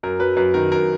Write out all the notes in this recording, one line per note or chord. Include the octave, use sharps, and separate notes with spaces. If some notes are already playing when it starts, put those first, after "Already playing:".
F#2 A#4
F#3 B4
F#2 B4
D#3 A#4
F#2 A#4